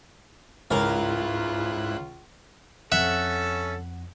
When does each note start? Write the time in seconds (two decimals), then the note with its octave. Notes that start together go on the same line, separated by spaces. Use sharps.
0.71 C#2 G#2 E4 F4 A#4 F5 F#6
2.92 F2 C#4 A4 E5 F#5